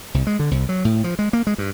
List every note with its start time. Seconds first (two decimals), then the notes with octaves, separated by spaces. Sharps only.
0.14 C2
0.27 G#3
0.39 D3
0.51 C2
0.69 F#3
0.85 A2
1.04 F3
1.19 G#3
1.33 A#3
1.47 G#3
1.58 G2